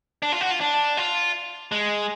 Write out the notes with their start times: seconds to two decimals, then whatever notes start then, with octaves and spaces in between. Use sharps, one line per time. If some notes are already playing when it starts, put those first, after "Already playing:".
0.22 D4
0.32 F4
0.41 F#4
0.51 F4
0.61 D4
0.97 F4
1.72 G#3